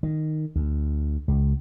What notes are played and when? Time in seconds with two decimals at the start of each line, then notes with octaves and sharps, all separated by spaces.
0.03 D#3
0.56 D2
1.28 C#2